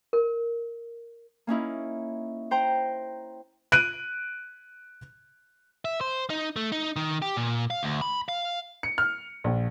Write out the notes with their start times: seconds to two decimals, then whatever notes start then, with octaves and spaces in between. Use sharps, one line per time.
0.13 A#4
1.47 A#3 C#4 D#4 E4
2.51 C5 G5 A#5
3.72 F#6 D7 D#7
5.85 E5
6.01 C5
6.30 D#4
6.56 A3
6.72 D#4
6.96 D#3
7.22 G4
7.37 A#2
7.70 F5
7.83 D2
8.02 B5
8.29 F5
8.83 C#7
8.98 F6
9.44 A#1